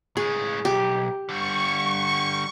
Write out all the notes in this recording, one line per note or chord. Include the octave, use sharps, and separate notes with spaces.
A2 G#3 G#4
B1 G4
D3 G3 C#6